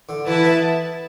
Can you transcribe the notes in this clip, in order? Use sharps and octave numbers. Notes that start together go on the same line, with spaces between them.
D3
E3 E4 B4 E5 A5
B3